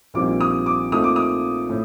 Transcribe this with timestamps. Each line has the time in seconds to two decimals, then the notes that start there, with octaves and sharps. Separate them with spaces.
0.14 A#1 A#2 G3 C4 D#4 D6
0.41 D#6
0.66 D6
0.92 A#2 A3 C4 D#4 D#6
1.04 D6
1.16 D#6
1.70 A2